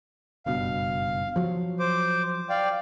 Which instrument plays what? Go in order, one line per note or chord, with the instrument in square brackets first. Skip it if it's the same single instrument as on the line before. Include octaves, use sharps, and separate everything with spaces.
[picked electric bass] F#1 G2 B2 [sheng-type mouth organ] F5
[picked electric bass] F3 F#3
[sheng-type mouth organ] C5 D6
D5 F5 G5